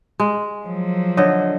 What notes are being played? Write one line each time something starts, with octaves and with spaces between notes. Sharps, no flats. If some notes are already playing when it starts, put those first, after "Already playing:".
G#3
F3 F#3
D3 C#5 D#5